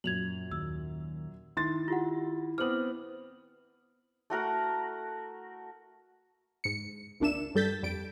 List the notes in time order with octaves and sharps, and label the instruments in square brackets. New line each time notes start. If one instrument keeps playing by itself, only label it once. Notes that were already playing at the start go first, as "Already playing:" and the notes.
[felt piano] F#2 A#2 [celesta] G#6 F7 F#7
[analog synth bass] D#2 [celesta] E6
[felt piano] D#3 [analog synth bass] E4 [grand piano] C6 A6
[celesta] F4 G4 F#5
[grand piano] B3 C4 C5 [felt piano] D6 D#6 [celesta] F6 F#7
[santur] A3 F#4 A#4 F#5
[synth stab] G#2 C#7
G#1 C#2 A#3 D4 E5 E7
G2 G3 A4 G6 A6 B6
F2 G3 D7